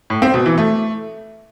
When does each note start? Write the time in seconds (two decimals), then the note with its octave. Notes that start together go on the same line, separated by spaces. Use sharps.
0.10 A2
0.22 C4
0.34 B2
0.46 E3
0.58 A3